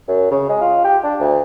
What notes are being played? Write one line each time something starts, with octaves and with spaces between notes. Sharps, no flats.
F#2
C#3
G#3
F4
G4
D4
D2